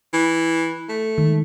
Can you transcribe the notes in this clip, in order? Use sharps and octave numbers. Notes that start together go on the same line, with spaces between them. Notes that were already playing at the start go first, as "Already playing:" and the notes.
E3
A3
D#3 G#3